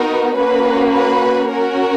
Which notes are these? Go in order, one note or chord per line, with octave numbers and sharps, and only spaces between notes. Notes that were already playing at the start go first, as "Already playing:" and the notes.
Already playing: B3 D#4 F#4 A#4
A#3 C#4 F#4 B4
B4
C#4 F#4 A#4